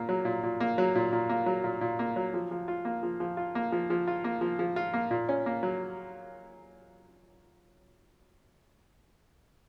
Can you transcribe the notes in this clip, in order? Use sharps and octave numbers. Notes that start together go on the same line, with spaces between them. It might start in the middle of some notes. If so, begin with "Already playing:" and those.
Already playing: A#2 A#3
F#3
A#2
A#2
A#3
F#3
A#2
A#2
A#3
F#3
A#2
A#2
A#3
F#3
F3
F3
F4
A#3
F3
F3
F4
A#3
F3
F3
F4
A#3
F3
F3
F4
A#3
A#2
C#4
A#3
F#3